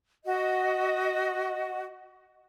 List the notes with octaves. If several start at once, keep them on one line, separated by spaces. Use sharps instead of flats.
F#4 D#5